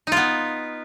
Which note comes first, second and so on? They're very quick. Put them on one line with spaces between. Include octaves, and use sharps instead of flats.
D#4 F4 B3